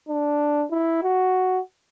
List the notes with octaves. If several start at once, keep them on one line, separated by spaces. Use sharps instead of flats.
D4
E4
F#4